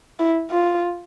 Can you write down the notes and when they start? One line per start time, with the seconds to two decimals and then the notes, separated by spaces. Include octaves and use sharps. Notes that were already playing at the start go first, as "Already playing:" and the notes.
0.19 E4
0.51 F4